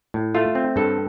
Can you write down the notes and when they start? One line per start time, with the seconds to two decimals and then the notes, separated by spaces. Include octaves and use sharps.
0.14 A2
0.35 A3 F4
0.55 C4
0.76 G2 A4